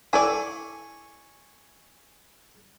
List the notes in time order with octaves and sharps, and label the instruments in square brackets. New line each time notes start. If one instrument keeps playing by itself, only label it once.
[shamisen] E4 A4 D5 [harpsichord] G#5 C#6